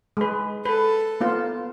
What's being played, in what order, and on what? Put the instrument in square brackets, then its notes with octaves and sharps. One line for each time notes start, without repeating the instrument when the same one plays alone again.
[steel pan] G#3 B4
[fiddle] A4 [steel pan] B4
[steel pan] A#3 B3 F4